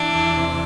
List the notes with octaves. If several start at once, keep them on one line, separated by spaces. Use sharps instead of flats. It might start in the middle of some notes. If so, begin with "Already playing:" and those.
Already playing: E3 D4
E2
C3